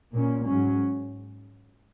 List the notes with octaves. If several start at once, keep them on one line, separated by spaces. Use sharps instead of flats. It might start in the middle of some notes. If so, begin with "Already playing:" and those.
A#2 A#3 C#4
G#2 F#3 C#4